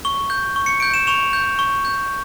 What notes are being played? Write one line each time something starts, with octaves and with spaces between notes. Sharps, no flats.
C#6 G7
G6
C#6
C#7
G6 D7
E7
C#6 F7
G6
C#6
G6